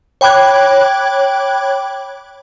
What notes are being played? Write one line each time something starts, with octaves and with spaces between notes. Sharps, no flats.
C#5 G5 B5 D6 F#6 G#6